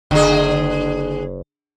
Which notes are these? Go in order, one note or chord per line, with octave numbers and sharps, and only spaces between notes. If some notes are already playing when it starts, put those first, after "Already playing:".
F#1 D3 G#4